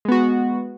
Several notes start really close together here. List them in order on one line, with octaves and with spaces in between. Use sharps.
G#3 B3 F#4